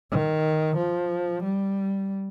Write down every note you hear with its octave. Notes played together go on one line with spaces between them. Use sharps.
D#3
F3
G3